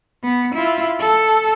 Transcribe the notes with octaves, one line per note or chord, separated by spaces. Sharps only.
B3
E4 F4
A4